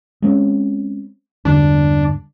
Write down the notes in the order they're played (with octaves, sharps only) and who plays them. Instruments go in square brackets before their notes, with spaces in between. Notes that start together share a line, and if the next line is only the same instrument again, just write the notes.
[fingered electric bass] G#3 C4 C#4
[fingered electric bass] E2 G2 D3 [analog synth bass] D4